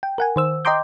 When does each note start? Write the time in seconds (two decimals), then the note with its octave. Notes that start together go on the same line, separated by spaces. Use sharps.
0.03 G5
0.18 A#4 F#5 G#5
0.36 D#3 C5 E6
0.65 D#5 G5 A#5 C6 D6 G6